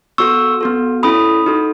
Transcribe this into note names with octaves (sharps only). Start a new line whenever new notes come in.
B3 F#4 A4 C#6 E6
B3 F#4 A4
C#4 E4 A4 B5 D#6
D#4 F#4 A4